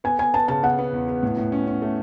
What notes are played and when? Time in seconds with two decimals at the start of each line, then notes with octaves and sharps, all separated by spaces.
0.04 B3 G#5
0.19 B3 G#5
0.34 B3 A5
0.48 C#3 A5
0.63 B3 F#5
0.79 B3
0.92 E2
1.08 B3
1.23 A2
1.37 A2
1.52 C#4
1.67 C#4
1.82 A3